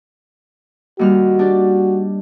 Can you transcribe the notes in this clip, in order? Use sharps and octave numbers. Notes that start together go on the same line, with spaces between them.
D#2 G3 F#4 F6
D4 G4 D5